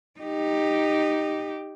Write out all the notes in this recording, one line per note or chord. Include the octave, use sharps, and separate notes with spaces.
D#4 G4